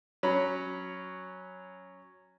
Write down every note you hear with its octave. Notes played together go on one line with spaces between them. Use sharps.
F#3 C#4 B5